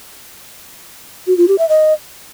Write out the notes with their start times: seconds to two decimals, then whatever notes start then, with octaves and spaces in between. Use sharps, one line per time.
1.27 F#4
1.38 F4
1.48 G4
1.58 E5
1.69 D#5